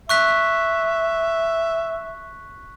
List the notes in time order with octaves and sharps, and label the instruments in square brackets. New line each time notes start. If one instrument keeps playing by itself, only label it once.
[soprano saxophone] E5 [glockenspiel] C#6 F#6 B6